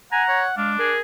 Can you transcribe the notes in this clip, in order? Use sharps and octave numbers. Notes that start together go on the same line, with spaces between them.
F#5 G#5 A#5
C#5
G#3 D4 F5
G#4 A#4